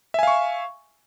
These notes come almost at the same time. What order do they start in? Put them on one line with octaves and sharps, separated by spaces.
E5 G#5 F5 C#6